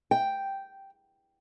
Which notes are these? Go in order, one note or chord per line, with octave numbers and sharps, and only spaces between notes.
G5